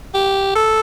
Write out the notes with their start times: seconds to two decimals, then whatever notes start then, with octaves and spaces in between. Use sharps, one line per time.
0.14 G4
0.55 A4